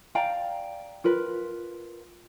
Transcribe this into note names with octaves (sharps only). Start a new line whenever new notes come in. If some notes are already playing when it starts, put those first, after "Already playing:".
D5 F5 G5 A#5
F4 A#4 B4